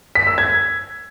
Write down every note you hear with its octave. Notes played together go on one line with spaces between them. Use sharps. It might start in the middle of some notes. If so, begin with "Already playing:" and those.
B6
E6
G#6